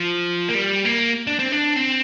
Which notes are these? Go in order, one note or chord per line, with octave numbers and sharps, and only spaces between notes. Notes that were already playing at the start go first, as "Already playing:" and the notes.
Already playing: F3
A#3
G3
A#3
D4
C4
D4
C4